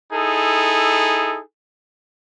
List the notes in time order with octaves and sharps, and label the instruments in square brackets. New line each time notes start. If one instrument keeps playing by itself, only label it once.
[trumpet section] D#4 E4 G#4 A4